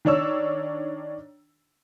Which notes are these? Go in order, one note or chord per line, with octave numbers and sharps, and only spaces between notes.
D#3 D4 C#5 E6